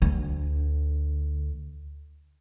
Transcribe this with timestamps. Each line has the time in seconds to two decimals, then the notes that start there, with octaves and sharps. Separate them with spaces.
0.02 D2 D3